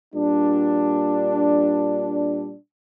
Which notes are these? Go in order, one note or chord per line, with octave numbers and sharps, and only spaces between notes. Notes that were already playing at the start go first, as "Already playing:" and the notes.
A#2 G3 D4